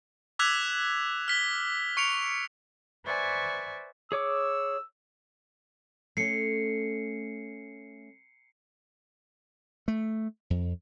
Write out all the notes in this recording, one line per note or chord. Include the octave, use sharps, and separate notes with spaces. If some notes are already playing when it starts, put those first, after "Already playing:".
D6 E6 F#6 G#6 B6 F7
F6 B6 G7
C#6 C#7 D7 F7
B4 C5 D5 E5 G#5 C#6
G#4 C#5 D6 E6
A3 C#4 C7 C#7
A3
F2